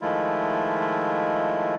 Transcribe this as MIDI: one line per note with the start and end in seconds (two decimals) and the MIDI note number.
0.02 1.75 51
0.02 1.75 53
0.02 1.75 56
0.02 1.75 57
0.02 1.75 64
0.02 1.75 65